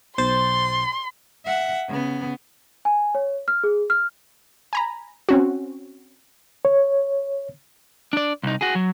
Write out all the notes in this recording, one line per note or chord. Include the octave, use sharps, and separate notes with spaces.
B1 C5 C6 A6
E5 F#5
C#3 B3
G#5
C#5
F6
G#4
F6
G#5 A#5 B5
C4 C#4 F#4
C#5
D4 D5
C2 D#4
F#4 G#4
F#3